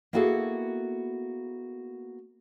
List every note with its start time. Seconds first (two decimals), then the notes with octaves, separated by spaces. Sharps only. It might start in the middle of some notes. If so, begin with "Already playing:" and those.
0.13 A#3 B3 E4 F#4 G#4 A4